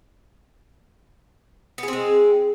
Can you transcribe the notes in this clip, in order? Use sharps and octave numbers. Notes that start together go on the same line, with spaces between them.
G#3 B3 C4 G#4